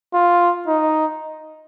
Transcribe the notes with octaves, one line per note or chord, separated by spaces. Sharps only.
F4
D#4